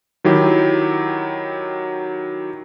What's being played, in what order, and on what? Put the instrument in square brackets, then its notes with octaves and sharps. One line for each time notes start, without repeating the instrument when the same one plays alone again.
[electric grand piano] D#3 F#3 E4 G4